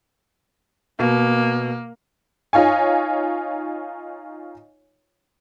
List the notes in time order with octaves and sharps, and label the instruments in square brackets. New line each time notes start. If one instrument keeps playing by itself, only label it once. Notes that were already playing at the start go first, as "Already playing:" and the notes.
[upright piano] B2 [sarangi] A#3
[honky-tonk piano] D#4 F4 C#5 G#5